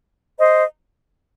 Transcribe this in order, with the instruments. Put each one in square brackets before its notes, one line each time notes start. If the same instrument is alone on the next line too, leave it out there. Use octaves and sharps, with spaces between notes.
[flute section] C5 D#5